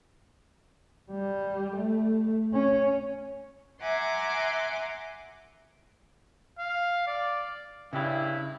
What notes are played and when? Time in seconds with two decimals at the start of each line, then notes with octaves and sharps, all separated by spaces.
1.11 G3
1.76 A3
2.54 C#4
3.81 E5 F#5 G#5 A#5 C6 D6
6.60 F5
7.07 D5
7.93 G2 C#3 E4 G4